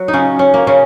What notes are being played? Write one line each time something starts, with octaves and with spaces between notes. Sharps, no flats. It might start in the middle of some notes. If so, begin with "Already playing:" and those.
Already playing: F#3 F#4
D#4
C#3 C#4
C#4
A#3
C#3 C#4